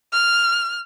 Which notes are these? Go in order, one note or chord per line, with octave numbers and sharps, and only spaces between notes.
F6